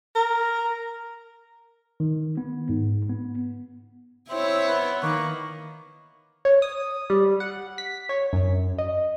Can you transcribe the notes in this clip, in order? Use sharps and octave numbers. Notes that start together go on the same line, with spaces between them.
A#4
D#3
B3
G#2
B3
C4 E4 C#5 E5
B3
D#3 A#3 C#6
C#5
D#6
G3
F#5
B6
C#5
F#2
D#5